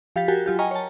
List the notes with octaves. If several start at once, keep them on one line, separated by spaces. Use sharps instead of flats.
F3 G4 F5 G6 A6 B6
F#4 G4 A#4 G5 G#5
F#3 F4 G4
D#5 G5 G#5 A#5 C#6 F6
C#5 A5